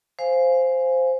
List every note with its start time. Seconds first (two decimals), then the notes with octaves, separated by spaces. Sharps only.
0.19 C5 F5 G#5